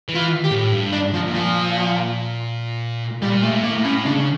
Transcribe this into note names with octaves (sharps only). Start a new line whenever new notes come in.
E3
F4
G4
A2
G2
D4
F3
A#2
F3
A#2 G3
A3
A2
A#3
A2
C#4
C#3 D4